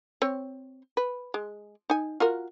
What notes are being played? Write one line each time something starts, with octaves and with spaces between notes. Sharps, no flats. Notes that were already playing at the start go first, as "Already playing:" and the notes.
C4 C#5
B4
G#3
D#4 G#5
F4 F#4 A#4